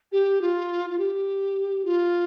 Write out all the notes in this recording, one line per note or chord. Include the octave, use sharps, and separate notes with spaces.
G4
F4
F4
G4
F4